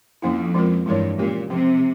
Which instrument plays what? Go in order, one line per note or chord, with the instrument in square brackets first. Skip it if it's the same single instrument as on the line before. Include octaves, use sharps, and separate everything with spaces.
[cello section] F2 [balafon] F3 A#3 C#4 E4
[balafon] F3 G#3 C4 F4 A#4
[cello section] G2 [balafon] E3 G#3 E4 A#4 C#5
[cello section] A#2 [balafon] G#3 C#4 G4 A#4
[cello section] C3 [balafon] F3 C4 G4